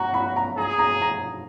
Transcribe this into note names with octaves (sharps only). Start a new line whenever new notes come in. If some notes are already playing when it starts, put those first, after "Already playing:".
Already playing: F#4 A#5
B5
A#5
G#4 A#5
A#5
A#5